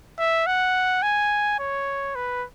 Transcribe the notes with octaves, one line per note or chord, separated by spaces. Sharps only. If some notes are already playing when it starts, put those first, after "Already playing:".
E5
F#5
G#5
C#5
B4